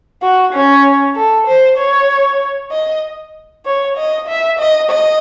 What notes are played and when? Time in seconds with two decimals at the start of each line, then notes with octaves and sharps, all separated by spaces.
0.22 F#4
0.53 C#4
1.15 A4
1.47 C5
1.78 C#5
2.71 D#5
3.66 C#5
3.97 D#5
4.28 E5
4.59 D#5
4.90 D#5